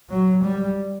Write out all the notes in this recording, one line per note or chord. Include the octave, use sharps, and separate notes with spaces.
F#3
G3